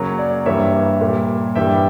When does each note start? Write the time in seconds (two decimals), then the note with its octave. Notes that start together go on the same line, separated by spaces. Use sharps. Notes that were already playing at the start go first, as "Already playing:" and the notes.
Already playing: F#2 C#3 F#3 A#3 C#5
0.19 D5
0.46 G2 E3 G3 A#3 C#5 E5
1.01 A#2 G3 A#3
1.55 G2 E3 G3 E5 G5